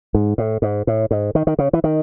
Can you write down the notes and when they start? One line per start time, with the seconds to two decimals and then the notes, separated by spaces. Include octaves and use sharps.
0.14 G#2
0.38 A2
0.62 G#2
0.87 A2
1.11 G#2
1.35 D#3
1.47 D#3
1.59 C#3
1.73 E3
1.84 D#3